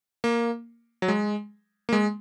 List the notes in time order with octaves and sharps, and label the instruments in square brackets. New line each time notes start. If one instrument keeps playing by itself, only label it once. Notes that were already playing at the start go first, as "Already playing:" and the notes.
[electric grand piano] A#3
F#3
G#3
A#3
G#3